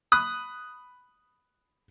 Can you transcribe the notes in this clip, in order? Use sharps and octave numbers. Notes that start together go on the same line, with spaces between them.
B5 D#6 F#6